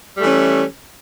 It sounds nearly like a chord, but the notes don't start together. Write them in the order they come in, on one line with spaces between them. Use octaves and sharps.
G3 A3 E3 C#4